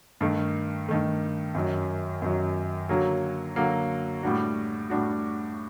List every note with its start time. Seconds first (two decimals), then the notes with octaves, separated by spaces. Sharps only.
0.21 G2 D#3 A3
0.88 G2 D#3 A3
1.55 F#2 D#3 F#3
2.22 F#2 D#3 F#3
2.89 D3 F#3 A#3 F#4
3.56 D3 F#3 A#3 F#4
4.23 A2 G3 D4 F#4
4.90 A2 G3 D4 F#4